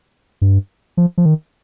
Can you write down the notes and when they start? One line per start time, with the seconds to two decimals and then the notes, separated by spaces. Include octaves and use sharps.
0.42 G2
0.97 F3
1.18 F3
1.26 D#3